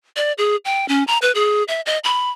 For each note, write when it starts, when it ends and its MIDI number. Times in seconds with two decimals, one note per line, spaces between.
0.16 0.33 74
0.38 0.56 68
0.65 0.88 79
0.88 1.04 61
1.07 1.18 82
1.22 1.32 71
1.35 1.63 68
1.68 1.81 76
1.86 1.98 75
2.04 2.30 83